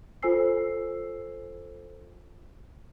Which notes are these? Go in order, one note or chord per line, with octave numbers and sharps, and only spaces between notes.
F4 A4 C5 G#5 E6 C7